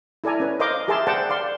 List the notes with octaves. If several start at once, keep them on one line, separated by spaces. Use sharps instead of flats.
E4 A4 D5 G#5 A#5
C#4 B4
A#4 C5 D#5 F5 C6 D6
G4 G#4 A#4 E5 A5 C6
C5 D5 F#5 G5 A5
D5 F5 C6